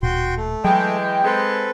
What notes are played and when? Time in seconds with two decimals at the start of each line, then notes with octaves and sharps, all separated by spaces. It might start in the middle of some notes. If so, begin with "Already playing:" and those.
0.03 D1 A#2 F#4 G5 C6
0.37 A3
0.64 E3 F#3 G#3 G5
1.24 G#3 C4 A4 B4